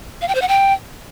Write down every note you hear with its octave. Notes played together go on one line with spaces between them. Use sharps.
F5
G5
C5
F#5
G5